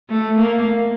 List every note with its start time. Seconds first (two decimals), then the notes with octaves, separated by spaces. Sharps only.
0.10 A3
0.39 A#3